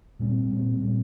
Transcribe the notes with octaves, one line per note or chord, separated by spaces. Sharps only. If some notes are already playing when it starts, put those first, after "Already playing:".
A#2 G3 C4
A#2 G3 C4
A#2 G3 C4